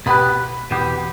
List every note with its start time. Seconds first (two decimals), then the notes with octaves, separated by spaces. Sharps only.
0.06 B2 B3 G4 B4 B5
0.71 E2 B2 B3 G4